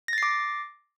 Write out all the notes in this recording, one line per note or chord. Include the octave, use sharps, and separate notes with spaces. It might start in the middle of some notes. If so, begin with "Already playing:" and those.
D6 A6 A#6 C7